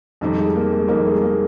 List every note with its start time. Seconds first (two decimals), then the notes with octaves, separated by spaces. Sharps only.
0.21 F2 D#3 G3 C4 D#4
0.38 G#3
0.56 A#3
0.72 G#3
0.88 F2 D#3 G3 A#3 C4 D#4
1.05 G#3
1.22 A#3